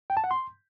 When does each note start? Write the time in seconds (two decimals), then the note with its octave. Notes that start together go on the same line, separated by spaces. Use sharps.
0.10 G5
0.17 A5
0.24 F#5
0.31 C6